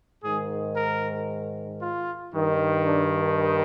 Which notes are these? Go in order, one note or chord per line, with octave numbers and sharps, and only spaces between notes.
G#2 D#3 G#4
A#4
F4
G2 D#3
D4